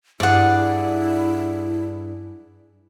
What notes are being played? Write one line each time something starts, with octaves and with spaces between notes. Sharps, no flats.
G2 D4 E4 G#4 D5 F#5